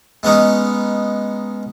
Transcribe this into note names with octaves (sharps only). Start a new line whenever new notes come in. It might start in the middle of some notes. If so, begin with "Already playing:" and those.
G#3 B3 C#4 D#4